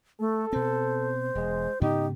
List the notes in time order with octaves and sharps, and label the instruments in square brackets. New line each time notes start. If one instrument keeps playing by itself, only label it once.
[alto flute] A3 [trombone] A4
[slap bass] B2 C4 [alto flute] C5
[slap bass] E1 [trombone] G#3
[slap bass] G#2 C#3 B3 [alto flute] D#4 [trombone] G4